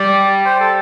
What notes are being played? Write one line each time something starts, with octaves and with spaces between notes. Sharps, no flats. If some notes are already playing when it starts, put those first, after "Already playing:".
Already playing: G3 D5
C5
A4